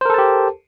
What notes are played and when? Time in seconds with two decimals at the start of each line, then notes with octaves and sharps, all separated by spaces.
0.01 C5
0.05 A#4
0.10 A4
0.14 A5
0.18 G4